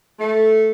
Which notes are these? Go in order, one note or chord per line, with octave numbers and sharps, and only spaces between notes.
A3